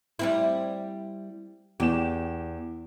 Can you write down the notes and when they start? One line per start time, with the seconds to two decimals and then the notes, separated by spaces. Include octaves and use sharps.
0.19 G3 C4 E4
1.80 E2 G4 E7